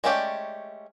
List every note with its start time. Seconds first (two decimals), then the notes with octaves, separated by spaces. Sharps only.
0.04 G#3 A3 C#4 G4 D5